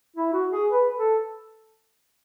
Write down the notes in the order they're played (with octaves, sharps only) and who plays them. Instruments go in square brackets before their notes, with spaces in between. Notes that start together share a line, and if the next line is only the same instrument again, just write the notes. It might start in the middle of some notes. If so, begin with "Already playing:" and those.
[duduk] E4
F#4
G#4
B4
A4